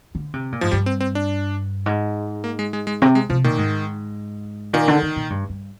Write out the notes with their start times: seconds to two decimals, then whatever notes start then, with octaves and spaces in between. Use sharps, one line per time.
0.15 D3
0.34 C3
0.52 A#2
0.61 G#2 F3
0.71 G2 G3
0.86 C4
1.00 C4
1.15 D4
1.86 G#2
2.44 A#3
2.59 G#3
2.73 G#3
2.87 G#3
3.02 C3 C4
3.15 G#3
3.30 C3 F3
3.44 A#2 D#3
3.58 G#2
4.73 A#2 D#3
4.88 D3
5.02 D3
5.16 A#2
5.30 G2
5.49 G2